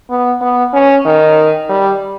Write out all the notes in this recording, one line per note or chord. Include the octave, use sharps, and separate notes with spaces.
B3
B3
C#4
D#3
G3